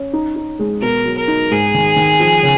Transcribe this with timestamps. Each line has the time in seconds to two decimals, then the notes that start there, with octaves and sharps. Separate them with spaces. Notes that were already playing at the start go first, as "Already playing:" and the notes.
Already playing: C#4
0.13 D#4
0.36 D#4
0.59 G#3
0.82 B2 A#4
1.05 F#3
1.17 A#4
1.28 D#4
1.51 G#2 G#4
1.74 D#3
1.96 D#3
2.20 F3
2.43 C#3